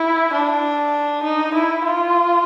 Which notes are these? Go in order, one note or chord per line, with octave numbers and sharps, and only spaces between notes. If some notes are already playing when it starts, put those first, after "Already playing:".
Already playing: E4
D4
D#4
E4
F4